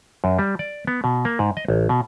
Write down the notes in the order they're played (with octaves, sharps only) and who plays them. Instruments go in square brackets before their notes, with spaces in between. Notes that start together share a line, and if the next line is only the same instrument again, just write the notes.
[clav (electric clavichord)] F#2
G3
D5
B3
B2
A#3
G#2
D#5
A1
B2